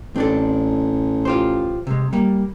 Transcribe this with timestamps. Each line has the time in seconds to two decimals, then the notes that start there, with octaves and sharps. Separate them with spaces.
0.16 A1 C4 D4 A4
1.25 F4 G4 C5
1.87 C3 G#3
2.13 G3 A#3